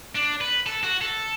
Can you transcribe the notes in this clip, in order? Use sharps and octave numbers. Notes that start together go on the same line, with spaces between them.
D4
B4
A4
F#4
A4